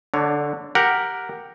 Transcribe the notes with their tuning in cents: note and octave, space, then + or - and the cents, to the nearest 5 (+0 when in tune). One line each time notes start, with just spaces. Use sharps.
D3 +0 D4 +30 C#5 +15
G4 +0 A#4 +0 F#5 -5